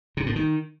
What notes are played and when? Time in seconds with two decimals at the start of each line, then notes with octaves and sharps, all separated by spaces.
0.17 C3
0.26 A2
0.36 D#3